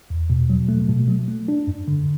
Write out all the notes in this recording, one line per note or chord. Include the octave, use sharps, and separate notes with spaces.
E2
B2
F#3
A3
B2
F#3
A3
D4
F#2
D3